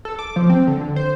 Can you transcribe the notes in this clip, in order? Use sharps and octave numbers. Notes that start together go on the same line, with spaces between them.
A4
D6
F3
C4
D3
C5